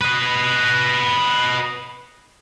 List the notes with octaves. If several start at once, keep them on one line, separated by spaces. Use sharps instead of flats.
B4 D#5